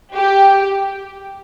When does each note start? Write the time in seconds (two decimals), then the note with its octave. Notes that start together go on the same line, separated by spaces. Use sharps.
0.15 G4